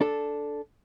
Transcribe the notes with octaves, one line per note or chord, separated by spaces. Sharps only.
D4 A4